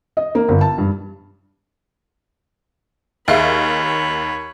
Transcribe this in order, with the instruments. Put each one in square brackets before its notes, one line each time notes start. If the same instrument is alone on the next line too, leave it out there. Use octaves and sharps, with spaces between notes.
[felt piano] D#5
A#3
G1
A5
G2
[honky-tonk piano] D#2 [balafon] G#4 E5 F5 [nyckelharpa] C#5 B5